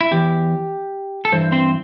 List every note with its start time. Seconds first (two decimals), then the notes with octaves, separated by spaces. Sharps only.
0.01 E4
0.11 E2 E3 G4
1.25 A4
1.32 G2 E3 C5
1.52 C4 C5